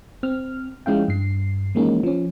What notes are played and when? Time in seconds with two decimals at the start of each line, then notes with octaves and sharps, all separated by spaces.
0.23 C4 F6
0.86 F3 G#3 C#4 E4 F5 G5
1.08 G2 C7
1.75 E3 F3 G#3 A#3 C#4 D#4
2.03 F3 C#4